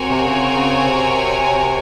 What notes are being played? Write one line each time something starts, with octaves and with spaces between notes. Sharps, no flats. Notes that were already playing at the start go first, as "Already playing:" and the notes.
Already playing: C4 F#4 A#4 C#5 G#5
C3
C#3
C#3
C3